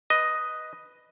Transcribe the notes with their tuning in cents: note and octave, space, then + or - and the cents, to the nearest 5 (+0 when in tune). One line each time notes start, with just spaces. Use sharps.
B4 +0 D#5 +0